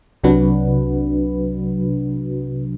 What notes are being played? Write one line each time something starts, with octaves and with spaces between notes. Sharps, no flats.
C2 C3 F#3 D4 F#4 B4